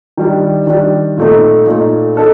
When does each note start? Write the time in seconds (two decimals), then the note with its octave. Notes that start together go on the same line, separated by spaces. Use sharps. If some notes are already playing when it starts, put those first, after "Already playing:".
0.17 D#3 G3 D4
0.67 D#3 G3 D4
1.17 A#2 A3 D#4
1.67 A#2 A3 D#4
2.17 D#4 A4